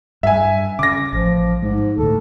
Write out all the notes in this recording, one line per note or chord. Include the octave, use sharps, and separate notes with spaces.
G2 E5 G#5
C#3 D6 A#6
A1 F3
G#2 G#3
D2 A2 A4